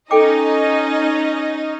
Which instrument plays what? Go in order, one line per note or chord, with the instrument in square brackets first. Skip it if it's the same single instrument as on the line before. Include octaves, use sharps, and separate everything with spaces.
[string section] C#4 D#4 D#5 [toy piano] A4 G5 D6